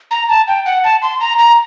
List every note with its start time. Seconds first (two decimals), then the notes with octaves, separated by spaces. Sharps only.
0.11 A#5
0.29 A5
0.48 G5
0.66 F#5
0.84 A5
1.02 C6
1.21 A#5
1.39 A#5